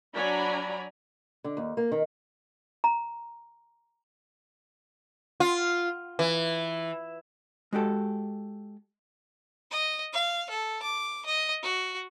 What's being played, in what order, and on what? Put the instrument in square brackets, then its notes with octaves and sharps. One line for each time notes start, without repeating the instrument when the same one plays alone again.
[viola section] F#3 D4 D5 G#5 A#5 B5
[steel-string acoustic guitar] D3
D#2
A#3
D#3
[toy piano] A#5
[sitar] F4
E3
[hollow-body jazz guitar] G#3 F#4 G4 A4
[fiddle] D#5
F5
A4
D6
D#5
F#4